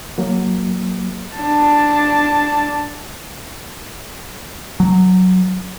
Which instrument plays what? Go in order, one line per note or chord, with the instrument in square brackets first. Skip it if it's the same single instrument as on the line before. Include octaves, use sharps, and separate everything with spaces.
[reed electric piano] F#3 A#3
[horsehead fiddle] D4 A5
[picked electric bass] F#3